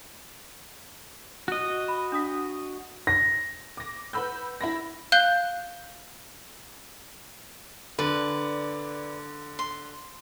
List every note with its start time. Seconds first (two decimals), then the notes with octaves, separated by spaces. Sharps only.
1.48 F#4 D#5
1.88 B5
2.12 D4 D#6 B6
3.07 A#6
3.77 D6 A#6
4.13 B4 F#5 B5 E6 G6
4.61 E4 B5 A#6
5.12 F5 F#6 G6 G7
7.99 D3 B4 D5
9.59 C6